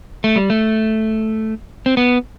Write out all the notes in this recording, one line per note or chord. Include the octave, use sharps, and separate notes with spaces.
A3
G3
A3
C4
B3